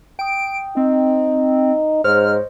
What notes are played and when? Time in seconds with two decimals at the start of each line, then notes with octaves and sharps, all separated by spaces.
0.19 G5 D#6 D7
0.77 C4 D#4
2.04 G#2 C5 C#5 D#5 F6